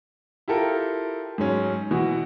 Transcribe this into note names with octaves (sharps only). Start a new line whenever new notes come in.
E4 F4 G4 A4 A#4
G#2 F#3 C#4
B2 E3 F#4